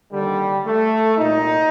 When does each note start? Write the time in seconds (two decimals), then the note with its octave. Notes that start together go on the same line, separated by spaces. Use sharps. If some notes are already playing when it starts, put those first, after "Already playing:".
0.12 D#2 D3 G3
0.65 A3
1.17 C2 A#2 D#4